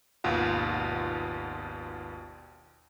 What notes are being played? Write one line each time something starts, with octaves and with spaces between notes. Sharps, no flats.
G#1 D#2 B2 F4 F#5